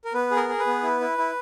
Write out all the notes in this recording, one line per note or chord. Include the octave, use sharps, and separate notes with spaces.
A#4
B3 B4
G#4
A#4
G#4
B4
B3
E4
E4
E4